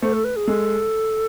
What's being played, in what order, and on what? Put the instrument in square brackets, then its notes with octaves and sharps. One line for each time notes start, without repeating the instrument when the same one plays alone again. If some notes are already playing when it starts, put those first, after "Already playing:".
[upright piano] A3 [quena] C5
[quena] A4
B4
G#4
[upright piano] G#3 [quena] A4